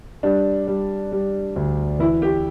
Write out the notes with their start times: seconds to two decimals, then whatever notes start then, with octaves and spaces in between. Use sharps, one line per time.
0.23 G3 D4
0.67 G3
1.12 G3
1.56 D2
1.99 E3 E4
2.22 G4